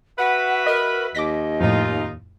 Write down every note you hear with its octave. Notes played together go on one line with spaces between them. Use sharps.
F#4 B4 E5 F#5
A#4 D#5
D#2 D#5 D6 A#6 B6
F2 A2 D#4 F4